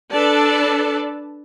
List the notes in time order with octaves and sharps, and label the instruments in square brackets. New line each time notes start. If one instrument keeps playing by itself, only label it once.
[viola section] D4 A4 B4 D5 A5